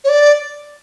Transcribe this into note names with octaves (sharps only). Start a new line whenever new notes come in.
C#5
D5